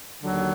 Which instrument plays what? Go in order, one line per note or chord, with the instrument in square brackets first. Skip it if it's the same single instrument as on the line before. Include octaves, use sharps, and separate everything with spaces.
[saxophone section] D#2 D3 F#3